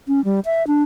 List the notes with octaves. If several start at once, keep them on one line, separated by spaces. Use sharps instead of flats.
C#4
G3
E5
D4